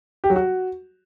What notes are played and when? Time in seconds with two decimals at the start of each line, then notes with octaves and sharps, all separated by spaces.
0.24 G4
0.30 F#3
0.36 F#4